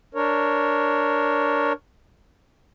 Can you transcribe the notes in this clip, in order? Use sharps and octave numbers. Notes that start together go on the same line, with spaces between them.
D4 A#4 C#5